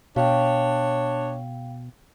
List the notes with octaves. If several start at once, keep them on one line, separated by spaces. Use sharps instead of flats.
B2 D4 C#5 F5 G5